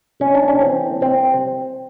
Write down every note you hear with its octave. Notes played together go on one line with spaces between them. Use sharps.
C3 C#4
D4
C#4
E3 C4
C3 C4